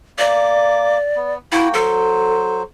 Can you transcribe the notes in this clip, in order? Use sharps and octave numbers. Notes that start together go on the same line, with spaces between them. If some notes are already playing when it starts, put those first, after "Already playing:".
A#3 D5 D6
B3
A#3 E4 F#4 G5
F#3 A4 C5